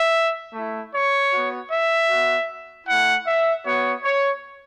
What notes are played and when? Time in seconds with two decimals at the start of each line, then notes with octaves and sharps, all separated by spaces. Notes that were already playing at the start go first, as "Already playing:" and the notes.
Already playing: E5
0.54 A3 E4
0.93 C#5
1.33 B3 F#4
1.71 E5
2.09 B3 F#4
2.87 A3 E4 F#5
3.26 E5
3.65 B3 F#4 C#5
4.04 C#5